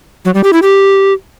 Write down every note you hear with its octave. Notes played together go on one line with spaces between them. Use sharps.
F#3
G3
G4
E4
G4